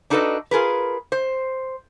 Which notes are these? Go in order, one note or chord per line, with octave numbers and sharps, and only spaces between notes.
D4 D#4 F#4 A4 B4 D#5
F4 G#4 A#4 B4
C5